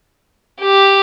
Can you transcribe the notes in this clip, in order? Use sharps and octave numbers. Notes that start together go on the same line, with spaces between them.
G4